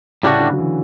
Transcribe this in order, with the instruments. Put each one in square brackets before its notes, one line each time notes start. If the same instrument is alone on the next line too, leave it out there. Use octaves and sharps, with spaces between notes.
[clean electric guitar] A2 G3 D4 F#4 [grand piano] C#3
[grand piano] D3
F#3
E3